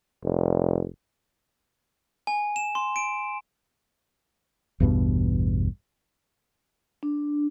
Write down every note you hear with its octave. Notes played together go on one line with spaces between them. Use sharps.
F1
G#5
E7
C6
D7
A1 E2 G2 B2
D4